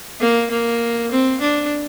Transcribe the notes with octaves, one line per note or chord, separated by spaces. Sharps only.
A#3
A#3
C4
D4